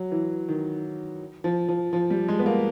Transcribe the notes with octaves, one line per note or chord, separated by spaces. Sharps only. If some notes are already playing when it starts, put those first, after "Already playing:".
Already playing: F#3
E3
D#3
F3
F3
F3
G3
G#3
B3
A#3